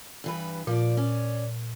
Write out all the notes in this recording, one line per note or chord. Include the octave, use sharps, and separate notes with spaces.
G2 E3 B4
A#2 F3 D5
C#4 D5